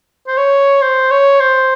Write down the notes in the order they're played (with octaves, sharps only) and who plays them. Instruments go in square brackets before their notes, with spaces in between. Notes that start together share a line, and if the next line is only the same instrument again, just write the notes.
[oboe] C5
C#5
C5
C#5
C5